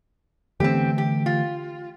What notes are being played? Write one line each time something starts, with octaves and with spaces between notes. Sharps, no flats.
D3 E3 A3 C4 G4
G4
F4